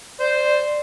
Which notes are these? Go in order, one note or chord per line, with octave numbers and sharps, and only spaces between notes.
C5 D5